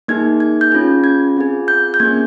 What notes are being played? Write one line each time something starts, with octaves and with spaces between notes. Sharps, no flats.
A#3 D#4 G#4 G#6
G#6
G6
C#4 F4 G#4 G#6
G#6
C4 F4 G#4
G6
G6
A#3 C#4 G#4 G#6